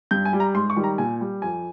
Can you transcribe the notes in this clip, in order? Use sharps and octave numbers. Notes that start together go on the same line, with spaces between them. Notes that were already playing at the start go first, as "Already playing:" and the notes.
G2 G6
G#5
G3
A#5
G#2 C6
C#6
D#3 G3
A#5
A#2 G#5
G3
F2 G#5